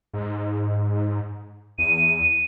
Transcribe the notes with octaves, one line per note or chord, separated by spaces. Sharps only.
G#2
E2 D#7